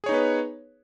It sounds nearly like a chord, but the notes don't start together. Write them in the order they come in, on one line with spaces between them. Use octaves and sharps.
G#4 C#5 D#4 B3 B4